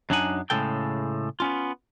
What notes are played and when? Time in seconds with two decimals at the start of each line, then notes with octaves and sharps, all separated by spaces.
0.10 F#2 F#3 D4 D#4 F#5 G#5
0.50 A2 C#3 G#3 A4 G5
1.40 B3 C#4 F4